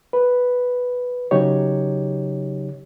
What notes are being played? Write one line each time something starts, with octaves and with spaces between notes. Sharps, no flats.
B4
C#3 F#3 D#4 G4 C#5